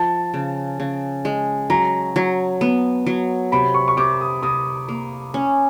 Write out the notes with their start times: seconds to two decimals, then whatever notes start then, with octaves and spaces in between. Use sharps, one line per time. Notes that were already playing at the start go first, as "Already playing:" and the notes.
Already playing: F3 A5
0.34 C#3
0.80 C#3
1.25 G#3
1.70 F#3 A#5
2.16 F#3
2.61 B3
3.06 F#3
3.52 C3 B5
3.74 C#6
3.88 C#6
3.97 C3 D6
4.21 D#6
4.43 C3 D#6
4.88 A#3
5.34 C#4